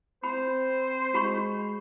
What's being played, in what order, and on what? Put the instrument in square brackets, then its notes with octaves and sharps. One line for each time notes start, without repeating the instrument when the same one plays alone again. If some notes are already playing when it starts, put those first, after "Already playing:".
[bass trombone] C4 [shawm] C5 [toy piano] B5
[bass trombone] G#3 [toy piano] F#4 B5 C#6